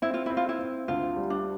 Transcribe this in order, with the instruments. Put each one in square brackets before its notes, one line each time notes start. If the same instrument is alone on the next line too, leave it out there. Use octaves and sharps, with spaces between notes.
[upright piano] C4 [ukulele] E4
[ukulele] F4
[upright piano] C4 [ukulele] E4
[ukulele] F4
E4
[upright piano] C4
[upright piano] D2 [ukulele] F4
[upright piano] G3
[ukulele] D4